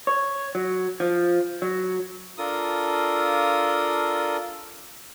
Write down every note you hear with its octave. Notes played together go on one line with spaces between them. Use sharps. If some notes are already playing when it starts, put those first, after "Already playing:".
C#5
F#3
F3
F#3
D4 F4 A4 A#4 D#6